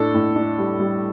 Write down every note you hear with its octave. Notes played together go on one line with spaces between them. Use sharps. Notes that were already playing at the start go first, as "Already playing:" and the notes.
Already playing: A2 D4 A4
A2
D4
G3
G3